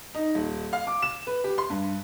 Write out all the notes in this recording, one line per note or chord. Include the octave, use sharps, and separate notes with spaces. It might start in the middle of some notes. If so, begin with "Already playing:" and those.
D#4
D#1
F5
D6
E7
B4
G4
C6
G2